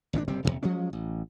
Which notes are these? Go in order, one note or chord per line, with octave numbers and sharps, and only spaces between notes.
G#1 A#2 C4 D4
F#1 C3 G3 C4
D#1 A2 C3
F3 F#3 G#3 C#4
A1